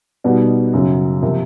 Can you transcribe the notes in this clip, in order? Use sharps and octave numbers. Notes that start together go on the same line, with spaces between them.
B2 G3 B3 D#4 F#4
F#2 C#3 F#3
C3 F3 A#3